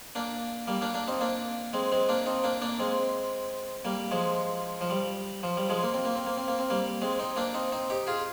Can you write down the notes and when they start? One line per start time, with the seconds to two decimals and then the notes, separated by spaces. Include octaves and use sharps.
0.15 A#3 D4
0.67 G3 A#3
0.81 A#3 D4
0.94 A#3 D4
1.08 C4 D#4
1.21 A#3 D4
1.73 G#3 C4
1.92 G#3 C4
2.09 A#3 D4
2.26 C4 D#4
2.44 A#3 D4
2.62 A#3 D4
2.79 G#3 C4
3.85 G3 A#3
4.11 F3 G#3
4.81 F3
4.90 G3
5.43 F3
5.57 G3
5.69 F3 G#3
5.83 A#3
5.94 C4
6.05 A#3
6.16 C4
6.27 A#3
6.38 C4
6.48 A#3
6.59 C4
6.70 G3 A#3
7.02 G#3 C4
7.20 C4 D#4
7.36 A#3 D4
7.54 C4 D#4
7.72 C4 D#4
7.90 D#4 G4
8.07 F4 G#4